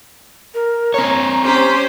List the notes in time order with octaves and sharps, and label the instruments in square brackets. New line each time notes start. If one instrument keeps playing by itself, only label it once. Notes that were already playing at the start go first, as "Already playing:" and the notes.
[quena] A#4
[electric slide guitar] C4 C#5 [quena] A#5
[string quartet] C#4 G4 C5